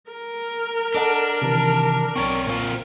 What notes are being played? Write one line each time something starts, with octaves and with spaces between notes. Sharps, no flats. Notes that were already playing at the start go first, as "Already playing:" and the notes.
A#4
D4 A4 D#5 F#5
C3 D#3 E3
B1 C4 C#5 D5 C#6
A#2 C4 F4